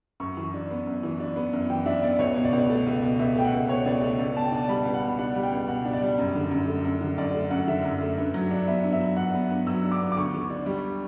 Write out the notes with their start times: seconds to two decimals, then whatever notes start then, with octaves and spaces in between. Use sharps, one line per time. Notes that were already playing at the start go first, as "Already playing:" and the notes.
0.20 F#2 C#6
0.37 E3
0.54 D4
0.70 B3
0.86 F#2
1.03 E3
1.20 D4
1.36 B3
1.53 F#2
1.70 E3 G5
1.86 D4 E5
2.03 B3 D5
2.19 C#2 C#5
2.36 B2
2.44 D5
2.53 C#2
2.70 A3
2.86 C#2
3.03 B2
3.19 C#2 E5
3.36 A3 G5
3.44 F#5
3.52 C#2
3.69 B2 C#5
3.86 C#2 D5
4.02 A3 D5
4.18 C#2 D5
4.36 B2 A5
4.44 G5
4.52 D4 A5
4.69 G3 B5
4.85 C#2
4.94 F#5
5.02 B2
5.18 D4 F#5
5.35 G3
5.43 G5
5.52 C#2
5.68 B2 F#5
5.85 D4
5.93 D5
6.02 G3
6.18 F#2
6.35 D3
6.51 F#2
6.67 A3
6.85 F#2
7.01 D3
7.18 F#2 D5
7.34 A3
7.51 F#2 F#5
7.68 D3 E5
7.85 F#2
8.01 A3
8.18 G2
8.34 F#3
8.51 D4
8.67 B3 E5
8.84 G2
8.93 E5
9.00 F#3
9.17 D4 F#5
9.34 B3
9.50 G2
9.67 F#3 E6
9.84 D4
9.91 D6
10.00 B3
10.12 D6
10.17 D2 C#6
10.34 D3
10.50 D4
10.66 G3